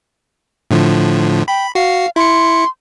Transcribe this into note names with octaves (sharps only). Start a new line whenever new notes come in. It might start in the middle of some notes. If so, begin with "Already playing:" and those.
A2 D3 F3
G5 B5
F#4 F5 C7
E4 C6 C#7